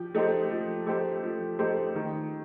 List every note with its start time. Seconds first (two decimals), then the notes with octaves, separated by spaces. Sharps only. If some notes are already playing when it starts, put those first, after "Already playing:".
Already playing: F3 G4
0.15 A3 D#4 G4 C5
0.50 F3
0.87 A3 D#4 G4 C5
1.23 F3
1.59 A3 D#4 G4 C5
1.95 D#3